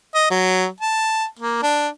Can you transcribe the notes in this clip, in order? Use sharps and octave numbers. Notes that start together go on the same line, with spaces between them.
D#5
F#3
A5
A#3
D4